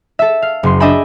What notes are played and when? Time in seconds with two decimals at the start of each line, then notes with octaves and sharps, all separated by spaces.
0.19 A4 E5
0.42 F5
0.63 F#1 C6
0.80 D4 D#5 E5 G5 G#5 B5